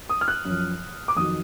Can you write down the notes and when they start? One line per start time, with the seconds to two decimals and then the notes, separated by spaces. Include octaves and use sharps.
0.09 D#6
0.21 F6
0.28 F#6
0.45 F#2 F3
1.08 D6
1.16 F2 D#3 F#3 D#6